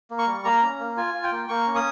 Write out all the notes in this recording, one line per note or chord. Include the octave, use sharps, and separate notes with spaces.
A#3
C#6
G3
A#3 A#5
C#4
A#3
F4 G#5
F4
G5
A#3
A#3 C#6
C#4
D#6